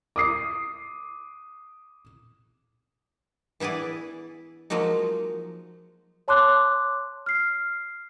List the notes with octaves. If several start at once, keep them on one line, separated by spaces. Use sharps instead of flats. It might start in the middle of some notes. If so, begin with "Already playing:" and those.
D6 D#6 C7
E3 B3 E4 G#4 D5
F3 F#3 G#3 A#3 D#4
C#5 A5 C6 D6 F#6
F6 C7